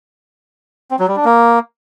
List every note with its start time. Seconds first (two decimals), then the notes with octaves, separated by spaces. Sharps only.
0.91 C4
0.99 F#3
1.08 G3
1.16 D4
1.25 A#3